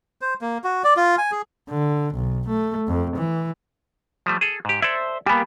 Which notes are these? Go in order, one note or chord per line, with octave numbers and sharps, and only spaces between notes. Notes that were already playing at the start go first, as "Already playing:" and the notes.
C5
A#3
F#4
D5
F4
G#5
G#4
D3
B1
A3
F2
E3
F3 G3 A3
G#4 A4
G#2 G4
A4 C5 D5 E5 G#6
G3 A#3 B3 G4 G#5 B5